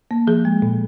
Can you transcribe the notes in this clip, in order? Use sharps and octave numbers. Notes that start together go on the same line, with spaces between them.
A#3
F3 G#4
G#3
A#2